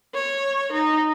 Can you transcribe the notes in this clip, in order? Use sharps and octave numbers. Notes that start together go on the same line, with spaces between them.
C#5
D#4